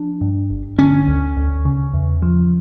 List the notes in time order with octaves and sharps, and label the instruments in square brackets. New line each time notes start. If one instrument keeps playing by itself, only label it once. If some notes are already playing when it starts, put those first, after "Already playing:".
Already playing: [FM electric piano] F3 [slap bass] D4
[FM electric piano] G2
G1
[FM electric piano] D3 [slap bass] C#4
[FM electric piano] D2
D2
C#3
E2
F3